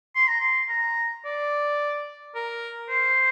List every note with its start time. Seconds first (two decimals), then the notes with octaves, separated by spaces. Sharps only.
0.15 C6
0.28 A#5
0.40 C6
0.69 A#5
1.25 D5
2.35 A#4
2.89 C5